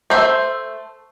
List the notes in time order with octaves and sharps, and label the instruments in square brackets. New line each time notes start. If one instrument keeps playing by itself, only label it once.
[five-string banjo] A3 C5 E5